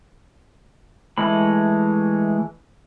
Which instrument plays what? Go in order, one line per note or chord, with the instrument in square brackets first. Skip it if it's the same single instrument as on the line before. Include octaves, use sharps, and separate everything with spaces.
[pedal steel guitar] E3 G#3 A3 B5